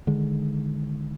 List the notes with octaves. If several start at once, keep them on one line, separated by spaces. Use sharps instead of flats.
D3 D#3 G#3